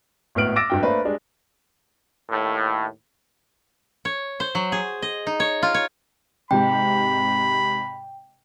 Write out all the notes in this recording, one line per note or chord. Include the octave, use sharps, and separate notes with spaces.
G#1 A2 B3 F6 D7 F#7
D6 E6 A6 A#6 D7 E7
G#1 G2 G5
A3 A#3 D4 B4 C5
G3 G#3 D4
D#2 A2
C#5
C5
F#3
G#4
D#5
D#4
C#5
F4
C#5
G#2 C3 G5 B5